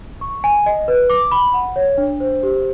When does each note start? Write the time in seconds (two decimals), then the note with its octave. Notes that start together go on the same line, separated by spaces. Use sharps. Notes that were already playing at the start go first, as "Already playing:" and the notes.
0.21 C#6
0.44 G#5
0.66 D#5
0.88 B4
1.10 D6
1.32 B5
1.54 F#5
1.76 C#5
1.98 D4
2.20 C5
2.43 G4